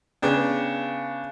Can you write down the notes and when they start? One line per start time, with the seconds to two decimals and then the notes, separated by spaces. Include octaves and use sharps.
0.22 C#3 B3 D4 G5